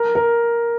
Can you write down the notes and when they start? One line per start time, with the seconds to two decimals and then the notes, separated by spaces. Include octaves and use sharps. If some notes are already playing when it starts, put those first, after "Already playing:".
Already playing: A#4
0.15 A#4